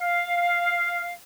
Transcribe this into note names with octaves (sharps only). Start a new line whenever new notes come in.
F5